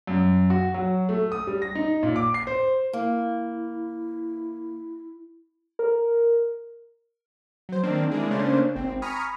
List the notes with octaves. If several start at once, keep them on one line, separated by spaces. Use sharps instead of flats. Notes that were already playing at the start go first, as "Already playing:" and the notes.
F#2
F#4
F#3
A3
D#6
G3
A#6
D#4
A#2
D6
C7
C5
A#3 E4
A#4
F#3 C5
D#3 A#3 C4 D4
G#3 A#3 D4 E4 G#4
C#3 A3 A#3 C#4 D4 C5
G#1 C4
G#5 A#5 B5 C#6 D#6 F6